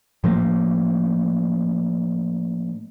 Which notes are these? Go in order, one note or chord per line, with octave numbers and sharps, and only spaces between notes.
A2 F3 A3 A#3